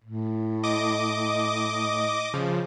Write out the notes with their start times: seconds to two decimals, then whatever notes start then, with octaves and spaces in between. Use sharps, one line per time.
0.04 A2
0.63 D#5 D6 D#6
2.34 C#3 F3